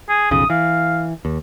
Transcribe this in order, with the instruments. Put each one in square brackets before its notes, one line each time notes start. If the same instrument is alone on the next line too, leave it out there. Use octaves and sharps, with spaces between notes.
[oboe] G#4
[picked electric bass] B1 F2 C#3 [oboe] D#6
[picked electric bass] E3 [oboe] F5
[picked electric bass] D#2